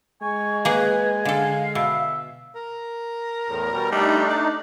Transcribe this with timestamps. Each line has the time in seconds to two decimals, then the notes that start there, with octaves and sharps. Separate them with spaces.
0.22 G#3 G#5 C#6
0.65 A#3 G#4 B4
1.25 D3 A4 F5
1.75 B2 E5
2.55 A#4
3.48 E2 A2
3.72 B2 G3
3.92 G3 A3 D4 D#4
4.30 D5